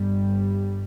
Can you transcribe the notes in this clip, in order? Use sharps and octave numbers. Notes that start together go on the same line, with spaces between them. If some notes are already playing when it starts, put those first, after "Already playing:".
Already playing: G1 G2 G3